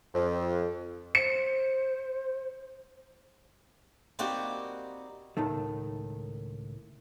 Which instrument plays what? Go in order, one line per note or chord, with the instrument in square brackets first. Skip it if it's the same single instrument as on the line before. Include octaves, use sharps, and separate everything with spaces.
[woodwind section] F2
[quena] C5 [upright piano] C#7
[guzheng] G3 A#3 C4 D#4 F#4 G4
[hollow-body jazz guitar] C#2 A2 D#3 A3